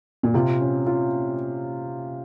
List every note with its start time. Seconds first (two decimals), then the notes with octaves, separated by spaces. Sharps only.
0.23 A#2
0.34 C3 F4
0.60 C#4
0.87 F4